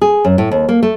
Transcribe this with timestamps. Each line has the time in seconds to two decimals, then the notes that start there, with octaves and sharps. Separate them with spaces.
0.02 G#4
0.25 F#2
0.38 A2
0.51 D#2
0.69 A#3
0.83 A3